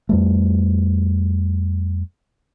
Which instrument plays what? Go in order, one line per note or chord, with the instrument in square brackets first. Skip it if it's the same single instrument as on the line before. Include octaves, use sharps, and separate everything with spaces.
[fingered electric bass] F2 G3 A3